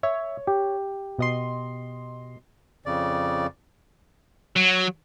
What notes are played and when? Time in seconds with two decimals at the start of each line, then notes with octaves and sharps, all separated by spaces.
0.03 C#5 E5
0.47 G4
1.19 B2 D#5 C6
2.86 F2 C#3 D5
4.56 F#3